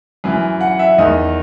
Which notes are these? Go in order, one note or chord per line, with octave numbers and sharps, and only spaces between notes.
F#2 E3
F#5
E5
E2 D#3 D#5